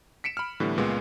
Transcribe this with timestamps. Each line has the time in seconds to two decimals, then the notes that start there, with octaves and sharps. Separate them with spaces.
0.24 B6 C#7 D7 E7
0.37 B5 F6
0.60 A2 D3 E3 G3 B3
0.77 C#2 A#2 G#3 B3